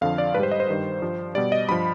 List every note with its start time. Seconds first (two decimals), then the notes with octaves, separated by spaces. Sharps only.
0.01 F2 D3 F3 F5
0.18 D5
0.34 G#2 B4
0.40 G3 C5
0.51 D#5
0.60 C5
0.68 G2 D#3 G3
1.02 G2 F3
1.35 B2 G3 D5
1.52 D#5
1.69 G2 F3 B5